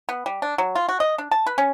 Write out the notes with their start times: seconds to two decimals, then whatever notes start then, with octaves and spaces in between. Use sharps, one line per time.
0.09 B3
0.26 G3
0.42 D4
0.58 F#3
0.75 F4
0.89 F#4
1.00 D#5
1.18 D4
1.31 A5
1.46 B4
1.58 C#4